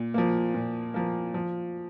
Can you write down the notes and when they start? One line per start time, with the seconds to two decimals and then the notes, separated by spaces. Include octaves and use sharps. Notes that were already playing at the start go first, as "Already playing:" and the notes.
Already playing: A#2
0.14 F3 A#3
0.54 A#2
0.94 F3 A#3
1.34 F3